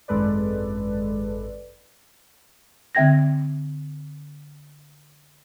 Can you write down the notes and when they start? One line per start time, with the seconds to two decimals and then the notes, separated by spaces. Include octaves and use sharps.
0.08 G#1 F#2 G#3 A4 B4 D5
2.95 D3 C4 E5 G5 G#6 A#6